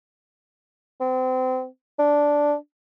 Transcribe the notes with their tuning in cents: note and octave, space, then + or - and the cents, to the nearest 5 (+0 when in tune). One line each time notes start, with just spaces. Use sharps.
C4 -30
D4 -5